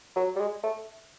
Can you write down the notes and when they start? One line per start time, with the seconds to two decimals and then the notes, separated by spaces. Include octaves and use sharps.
0.16 F#3
0.36 G3
0.40 G#3
0.63 A3